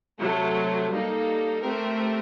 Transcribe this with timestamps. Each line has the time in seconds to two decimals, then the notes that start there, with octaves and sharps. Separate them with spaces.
0.20 C3 F#3 A3
0.90 G3 A#3 D#4 A4
1.62 A3 C4 G4 A#4